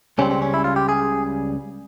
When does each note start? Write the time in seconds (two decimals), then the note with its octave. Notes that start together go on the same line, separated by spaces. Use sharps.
0.18 C#2 C#3 G3 C4 C#4
0.31 C4
0.42 C#4
0.54 E4
0.64 F4
0.76 G4
0.89 G#4